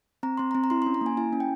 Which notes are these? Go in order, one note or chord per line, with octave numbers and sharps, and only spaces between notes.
C4 A#5
C4 C6
A#5
C4
A#5
E4 C6
C#4 C6
A#5
A#3
G#5
E4 G#5
C#4
G5